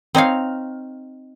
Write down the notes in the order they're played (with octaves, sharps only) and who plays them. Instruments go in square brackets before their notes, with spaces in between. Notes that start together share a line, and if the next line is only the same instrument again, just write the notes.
[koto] C4 D#4 C#5 F5